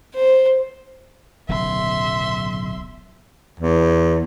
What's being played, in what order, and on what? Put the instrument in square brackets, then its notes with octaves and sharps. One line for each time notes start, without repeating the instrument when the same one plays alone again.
[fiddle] C5
[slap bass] D1 B1 C#3 [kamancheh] E5 C6
[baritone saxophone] E2